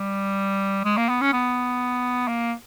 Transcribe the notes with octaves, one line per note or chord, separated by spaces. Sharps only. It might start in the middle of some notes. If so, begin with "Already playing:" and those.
Already playing: G3
G#3
A#3
B3
C#4
B3
A#3